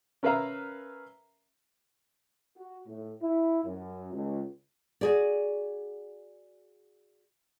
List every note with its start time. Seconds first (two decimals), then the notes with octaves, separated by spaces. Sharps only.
0.23 C#4 A#4 B4 E5 F5 A#5
2.57 F#4
2.87 A2
3.23 E4
3.65 F#2
4.13 C#2
5.01 F#4 G#4 D5